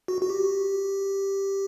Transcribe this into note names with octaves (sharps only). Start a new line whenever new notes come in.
F#4
F#4
G4